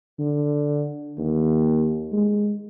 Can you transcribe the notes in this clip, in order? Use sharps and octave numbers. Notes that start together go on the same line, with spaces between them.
D3
D#2
G#3